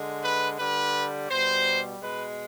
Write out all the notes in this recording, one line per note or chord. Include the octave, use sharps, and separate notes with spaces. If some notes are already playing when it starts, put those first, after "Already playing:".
Already playing: D3 G#3
B4
D3 G3 B4
B2 G3 C5
B2 G#3 B4